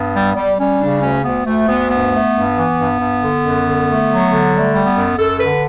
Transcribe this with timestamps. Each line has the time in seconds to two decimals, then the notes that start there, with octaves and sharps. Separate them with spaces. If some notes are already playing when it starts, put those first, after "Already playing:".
Already playing: G2 B3
0.15 G3
0.36 G3
0.58 G3 C#4
0.80 C#3 D4
1.02 D2 C#4
1.24 D2 B3
1.46 D2 A3
1.67 D2 B3
1.90 G2 B3
2.12 A3
2.33 G2
2.56 E3
2.77 G2
2.99 G2
3.21 D3
3.44 F#2
3.65 D3
3.87 A3
4.08 F#3
4.30 D3
4.53 G3 A3
4.74 G3
4.86 B3
4.96 F#2
5.18 F#2 A4
5.40 D3 B4